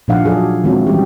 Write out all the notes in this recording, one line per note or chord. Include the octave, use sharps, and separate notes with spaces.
A#2 F3 D4 D#4 F5 F#5
F#3 G#4 A4 D5
F#4
D#3 G#3 C4 E4 F#4 C#5
E3 G3 C#4 G4